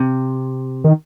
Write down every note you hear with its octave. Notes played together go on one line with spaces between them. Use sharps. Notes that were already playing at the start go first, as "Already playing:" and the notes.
Already playing: C3
D#3